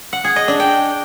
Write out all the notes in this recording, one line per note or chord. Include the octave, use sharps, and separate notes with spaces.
F#5
G#4
D#5
D4
G5